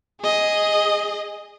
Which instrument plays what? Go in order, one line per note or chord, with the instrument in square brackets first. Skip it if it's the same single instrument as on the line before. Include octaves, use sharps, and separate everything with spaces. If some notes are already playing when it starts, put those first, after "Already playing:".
[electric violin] G#4 D#5